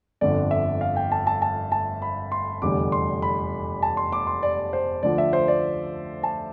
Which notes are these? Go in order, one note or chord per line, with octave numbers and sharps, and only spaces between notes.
G1 F2 D3 D5
E5
F5
G5
A5
A5
A5
A5
B5
C6
F1 E2 D3 G3 D6
C6
B5
A5
C6
D6
C6
D5
C5
D2 D3 F3 D5
E5
C5
D5
A5